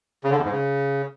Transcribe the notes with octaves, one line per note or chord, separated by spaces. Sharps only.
C#3
D3
E2
G#2
C#3